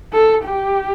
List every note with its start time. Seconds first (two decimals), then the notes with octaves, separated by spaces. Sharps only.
0.13 A4
0.44 G4